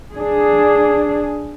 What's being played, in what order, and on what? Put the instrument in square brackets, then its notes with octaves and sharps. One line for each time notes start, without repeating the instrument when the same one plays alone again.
[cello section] D4 G#4